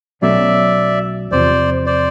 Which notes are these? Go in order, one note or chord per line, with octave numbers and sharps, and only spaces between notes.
B1 B2 F#3 A3 C#4 D5 E5
E2 C3 F3 C5 D5
C5 D5